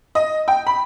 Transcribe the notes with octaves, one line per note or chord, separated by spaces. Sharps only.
D#5
G5
B5